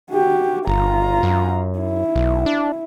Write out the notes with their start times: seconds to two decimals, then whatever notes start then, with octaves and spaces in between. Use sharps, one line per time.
0.11 F#4 G4
0.67 G1 F4 A#5
1.23 F#2
1.79 E4
2.16 B1
2.46 D4